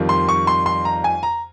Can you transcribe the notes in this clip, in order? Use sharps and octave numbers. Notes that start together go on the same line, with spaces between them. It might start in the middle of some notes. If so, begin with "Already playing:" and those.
Already playing: F2 D#3 G3
C6
C#6
C6
C6
A#5
G#5
A#5